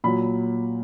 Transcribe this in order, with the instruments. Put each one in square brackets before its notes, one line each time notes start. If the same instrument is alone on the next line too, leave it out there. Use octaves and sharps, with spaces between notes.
[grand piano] A#2 F#3 B5